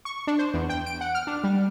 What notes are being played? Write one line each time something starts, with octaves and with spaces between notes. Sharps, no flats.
C#6
D4
C5
E2
G5
D7
F#5
F6
D4
G3